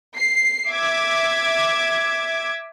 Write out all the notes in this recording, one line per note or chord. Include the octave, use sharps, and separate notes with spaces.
C7
E5 D6 G#6